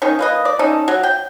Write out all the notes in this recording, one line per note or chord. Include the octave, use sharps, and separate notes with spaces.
D#3 C#4 D#4
A#3 B4 D#5
D5
C#4 D#4 A4
F#3
G5